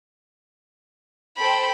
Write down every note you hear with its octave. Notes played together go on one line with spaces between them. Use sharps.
A4 C5 G5 B5